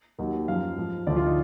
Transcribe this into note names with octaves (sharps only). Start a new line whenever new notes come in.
D#2 D#3 F#3
F#2 F3 F5
G#2 F3
D2 D3 F3 D5
F4
D#4